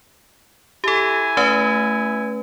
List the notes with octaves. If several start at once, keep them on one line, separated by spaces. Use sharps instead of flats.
E4 G4 A4 G#5
A3 C#4 B4